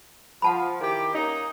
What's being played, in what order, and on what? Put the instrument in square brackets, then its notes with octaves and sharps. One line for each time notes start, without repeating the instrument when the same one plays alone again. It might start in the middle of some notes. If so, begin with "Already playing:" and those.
[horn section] F3 [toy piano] F#5 A5 B5
[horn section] D#3 E4 G4
A#3 C#4 D#4